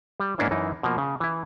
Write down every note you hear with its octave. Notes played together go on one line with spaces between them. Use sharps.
G3
G#2 A#3 C#4 D4 E4 C5
F#2 E3 D#4
B2 F3 A#3
C#3
E3 E4